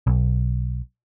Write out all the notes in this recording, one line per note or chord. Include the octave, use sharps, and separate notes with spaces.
B1